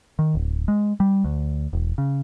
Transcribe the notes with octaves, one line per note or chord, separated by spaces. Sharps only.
D#3
D1
G#3
G3
D2
E1
C#3